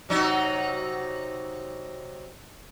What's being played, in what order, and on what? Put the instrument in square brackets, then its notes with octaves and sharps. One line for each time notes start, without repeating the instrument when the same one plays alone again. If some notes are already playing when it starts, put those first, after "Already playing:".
[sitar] C3 F#3 D#4